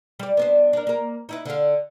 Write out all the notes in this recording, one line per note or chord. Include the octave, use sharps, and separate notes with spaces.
G3 D5
B3 D4 C5
D4 A#4
A#3 A#4
D#4 E4 B4
D3 F5